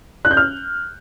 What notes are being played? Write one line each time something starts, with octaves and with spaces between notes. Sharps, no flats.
F#6
G6
F6